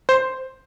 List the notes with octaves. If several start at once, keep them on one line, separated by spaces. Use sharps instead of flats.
C5